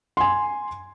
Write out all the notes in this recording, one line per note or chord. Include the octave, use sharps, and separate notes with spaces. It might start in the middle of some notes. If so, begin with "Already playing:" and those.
G#5 C6